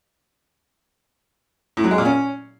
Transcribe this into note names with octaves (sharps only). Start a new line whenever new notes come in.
A2
F#3
G#3
A#2
C#4